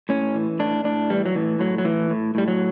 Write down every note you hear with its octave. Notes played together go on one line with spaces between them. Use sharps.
A2 C#4
E3
A2 D4
A2 D4
E3 G3
F#3
A2 E3
A2 F#3
F#3
A2 E3
A2
A2 G3
F#3